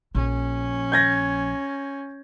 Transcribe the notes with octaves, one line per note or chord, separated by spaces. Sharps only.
A#1 C#4
G6 G#6 A#6